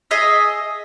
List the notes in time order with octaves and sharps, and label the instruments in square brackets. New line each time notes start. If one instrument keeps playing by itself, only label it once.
[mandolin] G#4 D#5 E5